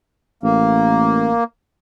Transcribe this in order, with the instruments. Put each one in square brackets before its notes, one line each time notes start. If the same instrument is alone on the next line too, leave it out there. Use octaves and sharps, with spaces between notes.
[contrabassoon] A1 [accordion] A#3